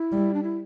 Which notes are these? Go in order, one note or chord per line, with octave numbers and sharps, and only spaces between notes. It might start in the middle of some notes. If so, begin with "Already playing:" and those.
Already playing: E4
G3
D4
E4